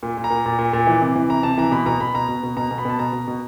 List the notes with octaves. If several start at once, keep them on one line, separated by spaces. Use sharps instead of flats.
A#2
A#2
A#5
A#2
A#2
A#2
A#2
E3
C3
E3
C3 A#5
C3 A5
E3 A#5
B2 B5
B2 A#5
B2 B5
B2 A#5
B2
B2
B2 A#5
B2
B5
B2 A5
B2 A#5
B2
B2